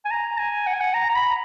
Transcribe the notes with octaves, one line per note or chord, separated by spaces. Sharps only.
G#5
A#5
G#5
F#5
G#5
F#5
A#5
A#5
B5